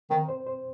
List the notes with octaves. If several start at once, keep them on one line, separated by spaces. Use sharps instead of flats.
D#3 C4
C5
C5